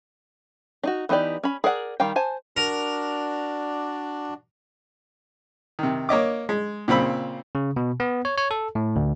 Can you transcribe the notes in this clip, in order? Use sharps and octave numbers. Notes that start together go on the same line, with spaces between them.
D4 D#4 F#4
E3 B3 D#4 G4 D5
C#4 B5
G#4 A#4 D5 F#5
D#3 G3 F5 G5
C5 G#5 A5
D4 F#4 A#4 D5
C3 D#3
A#3 C#5 D#5 D6
G#3
A#2 C#3 C4 B5 E6
C#3
B2
B3
C#5
C#5
A4
A2
D2